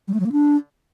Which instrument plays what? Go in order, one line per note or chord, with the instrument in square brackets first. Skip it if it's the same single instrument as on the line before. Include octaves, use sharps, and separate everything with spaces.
[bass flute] G3
A3
F#3
A#3
D4